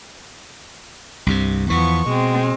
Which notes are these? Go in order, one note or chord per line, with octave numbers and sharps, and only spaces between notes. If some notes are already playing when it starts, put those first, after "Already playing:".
C2 G2 C3
E2 E3 F3 B3 C#6
B2 G#3 C4